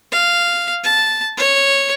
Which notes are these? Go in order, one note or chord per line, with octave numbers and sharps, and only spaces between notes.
F5
A5
C#5